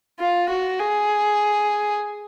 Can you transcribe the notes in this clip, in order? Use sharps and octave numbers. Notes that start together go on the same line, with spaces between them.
F4
F#4
G#4